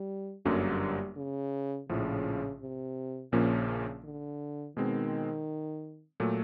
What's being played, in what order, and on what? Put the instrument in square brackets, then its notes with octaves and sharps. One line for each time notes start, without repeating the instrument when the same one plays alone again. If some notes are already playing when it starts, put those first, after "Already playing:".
Already playing: [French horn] G3
[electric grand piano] G1 F#2 D3 F#3 A#3 [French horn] G3
[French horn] C#3
[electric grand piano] A#1 A2 F3 [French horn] C#3
[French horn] C3
[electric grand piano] A#1 A#2 F3 A#3 C#4 [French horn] C#3
[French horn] D3
[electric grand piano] B2 G#3 C4 [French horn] D#3
[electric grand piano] A#2 F#3 A3